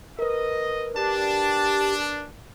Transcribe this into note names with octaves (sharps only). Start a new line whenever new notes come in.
A#4 B4 D#5
D4 G4 A5